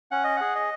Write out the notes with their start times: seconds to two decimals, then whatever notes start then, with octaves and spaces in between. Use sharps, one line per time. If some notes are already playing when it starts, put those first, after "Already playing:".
0.11 C#4 F#5
0.24 D#5
0.37 G#4 F#5
0.55 D#5